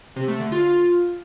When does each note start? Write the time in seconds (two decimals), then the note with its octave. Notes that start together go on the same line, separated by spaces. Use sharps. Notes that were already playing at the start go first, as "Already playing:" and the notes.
0.16 C3
0.28 A3
0.40 D3
0.52 F4